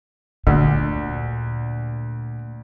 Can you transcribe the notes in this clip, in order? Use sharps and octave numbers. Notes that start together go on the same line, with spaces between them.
D2 A#2